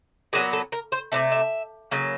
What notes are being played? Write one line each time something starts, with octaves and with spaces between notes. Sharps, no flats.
A#2 F#3 B3 G#4
A4
A#4
C5
C3 E3 A3 D5
E5
C#3 F#3 A#3